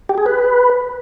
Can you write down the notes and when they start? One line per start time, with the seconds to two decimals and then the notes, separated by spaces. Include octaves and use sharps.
0.09 G4
0.18 G#4
0.26 B4